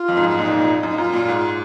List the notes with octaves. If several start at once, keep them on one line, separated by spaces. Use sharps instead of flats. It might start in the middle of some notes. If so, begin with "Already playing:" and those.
Already playing: F4
F2
G#2
F#2
F4
A#2 D#4
G#2
A#2
F#2
D#4
F#2 F4
A#2
G#2